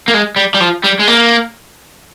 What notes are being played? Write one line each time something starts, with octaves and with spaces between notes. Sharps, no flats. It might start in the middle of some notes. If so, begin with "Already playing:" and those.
A#3
G#3
G3
G3
F3
G3
G#3
A#3